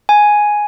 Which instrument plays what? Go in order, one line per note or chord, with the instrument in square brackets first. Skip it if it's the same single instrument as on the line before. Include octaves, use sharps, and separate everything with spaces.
[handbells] G#5